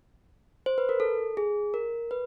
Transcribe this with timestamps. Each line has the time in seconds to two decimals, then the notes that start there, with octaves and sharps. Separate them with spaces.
0.66 C5
0.78 B4
0.89 A#4
1.00 A4
1.37 G#4
1.74 A#4
2.11 B4